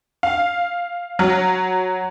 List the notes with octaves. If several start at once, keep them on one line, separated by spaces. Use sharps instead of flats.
F5
F#3